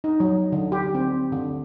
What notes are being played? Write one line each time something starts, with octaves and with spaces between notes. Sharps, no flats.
D#4
F#3
D3
G4
C4
D3